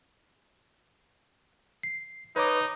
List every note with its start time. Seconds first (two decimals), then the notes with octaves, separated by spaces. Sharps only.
1.83 C7
2.36 D#4 B4 C#5 D6